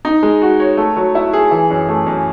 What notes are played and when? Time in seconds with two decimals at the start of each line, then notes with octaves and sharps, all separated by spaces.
0.05 D#4
0.23 G#3
0.42 F#4
0.60 C#5
0.77 A3
0.97 F#3
1.15 E4
1.33 G#4
1.51 E3
1.70 F#2
1.89 A3
2.06 F#2